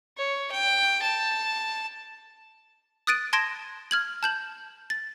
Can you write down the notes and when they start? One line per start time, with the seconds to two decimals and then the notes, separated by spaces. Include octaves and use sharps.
0.17 C#5
0.51 G5
1.02 A5
3.07 D#6 F#6 A6 D7 D#7
3.33 A5 C6 G#6 A#6 D7 E7
3.91 F6 G#6 F#7
4.23 A5 G6 F#7
4.90 A6